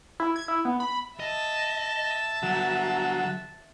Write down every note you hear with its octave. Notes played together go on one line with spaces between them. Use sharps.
E4
G#6
E4
B3
B5
D#5 E5 A5
D3 F#3 G3